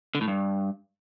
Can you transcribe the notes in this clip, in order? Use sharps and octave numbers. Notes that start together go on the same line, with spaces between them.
D3
A2
G2